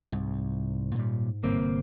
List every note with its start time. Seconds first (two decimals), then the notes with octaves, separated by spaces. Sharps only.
0.12 C2 G#2
0.95 A#2 G3
1.44 G1 C3 A#3 C4